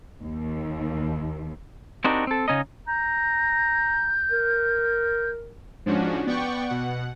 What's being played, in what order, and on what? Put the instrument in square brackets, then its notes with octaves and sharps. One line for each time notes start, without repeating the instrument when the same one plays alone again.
[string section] D#2
[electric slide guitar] C4 D4 D#4 F#4 G4 A#4
C4 A4
C#3 C#4 D#4 D#5
[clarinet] A#5 [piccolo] G6
[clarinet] A#4
[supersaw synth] G#2 F3 C#4 D4 F#4
B3 D5 F#5 G5 C#6
B2 F#5